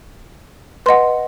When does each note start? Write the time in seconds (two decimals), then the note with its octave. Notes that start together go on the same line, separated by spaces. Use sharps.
0.86 B4 D#5 F#5 C6